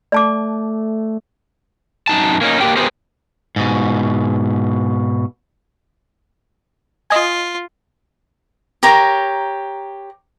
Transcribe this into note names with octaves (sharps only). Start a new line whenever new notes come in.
A3 D5 A5 D6
F#2 D#4 A5
A#3 C#4 D#4
A#3 C4 D4 G4 A#4 G5
B3 G4 G#4 A#4 C5
G#2 B2
F4 D#5 G#5
G4 A#4 C#5 A#5